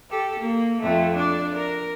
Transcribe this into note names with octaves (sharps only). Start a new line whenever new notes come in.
G4 A4
A#3
F2 A3 A4
D4 D5
A#4